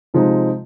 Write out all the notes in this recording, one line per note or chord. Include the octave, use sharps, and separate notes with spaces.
C3 F3 G#3 D#4